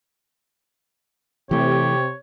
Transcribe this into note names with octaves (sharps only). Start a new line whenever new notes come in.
C3 E3 A3 G4 C#5